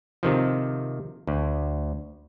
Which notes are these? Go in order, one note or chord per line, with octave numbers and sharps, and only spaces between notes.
C3 D#3 F3
D2